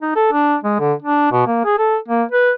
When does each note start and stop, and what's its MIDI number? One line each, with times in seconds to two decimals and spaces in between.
0.01 0.13 63
0.16 0.28 69
0.32 0.56 62
0.63 0.76 56
0.79 0.93 50
1.02 1.27 62
1.32 1.46 47
1.47 1.64 58
1.65 1.75 68
1.78 1.97 69
2.08 2.23 58
2.31 2.52 71